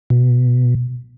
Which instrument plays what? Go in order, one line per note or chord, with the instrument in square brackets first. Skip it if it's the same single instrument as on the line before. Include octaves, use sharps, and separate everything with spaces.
[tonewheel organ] B2